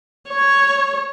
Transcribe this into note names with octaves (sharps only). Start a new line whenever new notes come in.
C#5